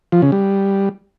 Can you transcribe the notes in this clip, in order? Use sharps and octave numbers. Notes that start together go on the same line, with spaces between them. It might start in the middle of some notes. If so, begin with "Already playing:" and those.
F3
C#3
G3